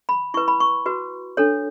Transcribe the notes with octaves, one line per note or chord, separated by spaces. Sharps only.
B5
E4 B4 C#6
B5
C#6
F#4 B4
D4 A4 C#5